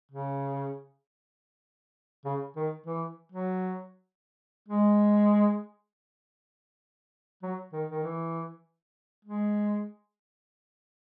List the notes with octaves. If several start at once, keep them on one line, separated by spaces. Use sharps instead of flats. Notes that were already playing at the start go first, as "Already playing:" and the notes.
C#3
C#3
D#3
E3
F#3
G#3
F#3
D#3
D#3
E3
G#3